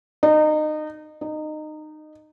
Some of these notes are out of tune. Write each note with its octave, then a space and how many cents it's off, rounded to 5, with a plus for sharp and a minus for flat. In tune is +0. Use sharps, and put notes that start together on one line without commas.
D#4 -25
D#4 -20